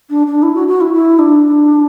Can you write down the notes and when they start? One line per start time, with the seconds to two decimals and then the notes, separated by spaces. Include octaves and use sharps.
0.10 D4
0.26 D4
0.42 E4
0.55 F#4
0.67 F#4
0.81 E4
0.93 E4
1.19 D4